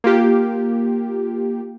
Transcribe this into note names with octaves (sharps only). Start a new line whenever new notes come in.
A#3 F4 G4